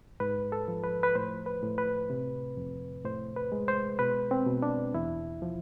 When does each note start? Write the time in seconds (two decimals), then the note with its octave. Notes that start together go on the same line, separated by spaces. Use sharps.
0.20 G#2 B4
0.52 A4
0.68 F3
0.84 B4
1.03 B4
1.15 A2 C5
1.46 B4
1.63 A2
1.78 B4
2.10 C3
2.57 F2
3.05 A2 C5
3.36 B4
3.52 G#3
3.68 C5
3.99 B2 B4
4.31 C4
4.46 B2
4.62 D4
4.94 E2 E4
5.42 F3